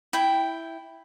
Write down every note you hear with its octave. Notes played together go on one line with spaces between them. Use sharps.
E4 G5